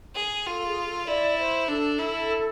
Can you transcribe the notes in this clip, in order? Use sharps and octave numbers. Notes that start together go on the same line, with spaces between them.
G#4
F4 A4
G#4
A4
E4 D5
C5
D4 A4
E4